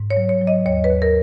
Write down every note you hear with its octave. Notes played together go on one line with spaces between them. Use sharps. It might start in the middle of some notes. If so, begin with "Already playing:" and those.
Already playing: G#2
C#5
F#3
C#5
F#3
D#5
D#2 C#5
B4
D#2
A#4